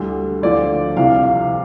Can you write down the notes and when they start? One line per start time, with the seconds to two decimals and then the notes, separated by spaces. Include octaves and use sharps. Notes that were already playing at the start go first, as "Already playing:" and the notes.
Already playing: D2 D3 G3
0.42 D2 D3 F3 D5
0.96 C2 C3 F3 F5
1.23 F5